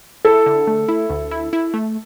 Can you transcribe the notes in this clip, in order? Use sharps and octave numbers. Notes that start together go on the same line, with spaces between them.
E4 A4
D3
A3
E4
D2
E4
E4
A3